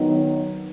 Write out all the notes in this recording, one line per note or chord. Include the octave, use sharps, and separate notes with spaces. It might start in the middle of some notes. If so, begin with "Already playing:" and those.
Already playing: D#3 F#3 B3 D#4